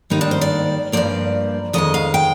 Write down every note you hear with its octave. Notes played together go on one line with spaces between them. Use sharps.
G#2 D#3 G3 A#3 D#4
D4
C5
D5
G2 F3 A#3 D5
F2 D#3 G#3 D#5
F5
G5